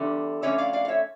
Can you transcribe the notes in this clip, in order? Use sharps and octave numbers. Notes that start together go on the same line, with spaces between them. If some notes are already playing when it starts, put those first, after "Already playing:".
Already playing: E2 D3 G3
F2 D3 A3 C#4 C#5 E5
D5 F5
D5 F5
F5
C#5 E5